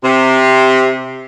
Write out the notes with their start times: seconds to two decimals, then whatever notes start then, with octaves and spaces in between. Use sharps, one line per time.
0.04 C3